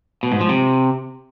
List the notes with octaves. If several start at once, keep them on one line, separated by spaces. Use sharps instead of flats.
B2
G#2
F3
C3